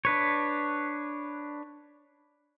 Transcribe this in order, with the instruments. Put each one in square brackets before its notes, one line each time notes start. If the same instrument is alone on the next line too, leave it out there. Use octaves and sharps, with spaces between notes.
[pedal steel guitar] D4 B4 C#5